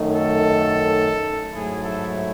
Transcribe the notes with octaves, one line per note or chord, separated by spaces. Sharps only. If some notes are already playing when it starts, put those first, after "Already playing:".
Already playing: F#2 D#3 A3 D#4
A4
G#2 F#3 A3 E4 G#4
A4